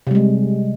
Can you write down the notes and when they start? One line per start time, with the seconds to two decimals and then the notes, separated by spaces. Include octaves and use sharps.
0.07 C3
0.11 G3
0.15 G#3